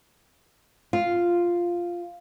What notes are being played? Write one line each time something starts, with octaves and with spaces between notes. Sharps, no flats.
F4